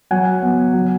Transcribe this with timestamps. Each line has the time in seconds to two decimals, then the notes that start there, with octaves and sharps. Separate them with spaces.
0.11 F#3 F#5 G#5
0.42 B3
0.73 F#3